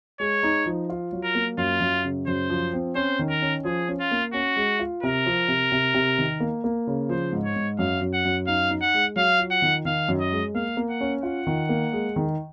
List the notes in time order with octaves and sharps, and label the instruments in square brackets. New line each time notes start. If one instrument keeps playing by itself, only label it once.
[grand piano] G#3 [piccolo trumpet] C#5
[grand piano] D#4
F3
F4
F#3
[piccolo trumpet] A#4
[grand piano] A#3
[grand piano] F#2 [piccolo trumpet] F4
[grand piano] F#2
C#3
[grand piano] F#2 [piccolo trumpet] C5
[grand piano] F3
C4
[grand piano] C#4 [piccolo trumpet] C5
[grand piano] D#3
[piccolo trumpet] A#4
[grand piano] C#4
[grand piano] F3 [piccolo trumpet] G#4
[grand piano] C#4
[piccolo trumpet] F4
[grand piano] A#3
[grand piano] C#4 [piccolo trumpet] F#4
[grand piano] G#3
F4
[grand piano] C3 [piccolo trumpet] A#4
[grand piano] F3
C3
C3
C3
D#3
A#3
A#3
C#3
[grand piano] F3 [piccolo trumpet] C5
[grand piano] G#2
[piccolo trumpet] C#5
[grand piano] G#2
[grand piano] F#2 [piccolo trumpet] F5
[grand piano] F#2
[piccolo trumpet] F#5
[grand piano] F#2
[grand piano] D#4 [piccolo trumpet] F5
[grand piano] D#4
[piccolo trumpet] F#5
[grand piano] G#3
[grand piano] F#3 [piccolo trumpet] F5
[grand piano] F4
[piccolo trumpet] F#5
[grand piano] D#3
[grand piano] D#3 [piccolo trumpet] F5
[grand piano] F#2
[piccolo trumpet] D#5
[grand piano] G#3
[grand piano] A#3 [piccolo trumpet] F5
[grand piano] A#3
[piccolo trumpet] F#5
[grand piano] C#4
[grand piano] F4 [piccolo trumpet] F#5
[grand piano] D#3
A#3
G#3
D#3